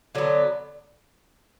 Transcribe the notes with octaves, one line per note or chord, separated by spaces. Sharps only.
D3 F#3 B3